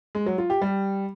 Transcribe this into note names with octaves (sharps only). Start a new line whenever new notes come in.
G#3
F#3
F4
G4
G3